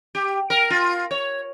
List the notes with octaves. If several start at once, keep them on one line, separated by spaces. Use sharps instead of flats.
G4
A#4
F4
C#5